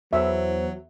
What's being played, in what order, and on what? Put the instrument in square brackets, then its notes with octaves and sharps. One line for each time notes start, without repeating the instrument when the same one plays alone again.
[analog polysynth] E2 [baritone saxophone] F#3 [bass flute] C5 [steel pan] E5